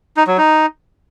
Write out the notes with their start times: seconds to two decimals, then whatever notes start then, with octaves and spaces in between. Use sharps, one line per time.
0.17 D#4
0.27 F#3
0.38 D#4